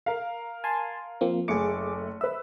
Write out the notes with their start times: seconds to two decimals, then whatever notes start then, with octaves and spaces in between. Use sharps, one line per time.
0.06 A#4 F5
0.64 G#5 A5 C6
1.21 F3 A#3 C4
1.48 F#1 A3 G#4 D6 C#7
2.21 B4 E5 E6